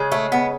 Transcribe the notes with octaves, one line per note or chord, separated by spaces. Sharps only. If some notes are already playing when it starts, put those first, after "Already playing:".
Already playing: C#3 G#3
A3
B3